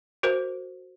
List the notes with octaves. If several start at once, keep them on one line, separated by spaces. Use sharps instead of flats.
F#4 A#4 C5